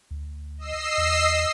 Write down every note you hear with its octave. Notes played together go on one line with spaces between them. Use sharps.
D2
D#5 E6 C7
E2